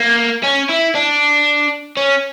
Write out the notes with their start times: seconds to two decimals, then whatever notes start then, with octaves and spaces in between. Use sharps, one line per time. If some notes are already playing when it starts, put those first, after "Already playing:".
Already playing: A#3
0.44 C#4
0.70 E4
0.95 D4
1.97 C#4